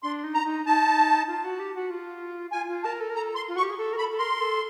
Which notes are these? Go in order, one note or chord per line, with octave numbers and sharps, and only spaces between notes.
D4 C6
D#4
A#5
D#4
D#4 A5
F4
F#4
G4
F#4
F4
F4 G#5
F4
A#4 A5
A4
A#4
A4 A#5
C6
F4
F#4 C#6
G4
G#4
A4
A#4
A4 B5
A4
A#4 C6
A4